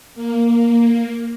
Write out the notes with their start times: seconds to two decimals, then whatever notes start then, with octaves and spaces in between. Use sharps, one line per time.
0.14 A#3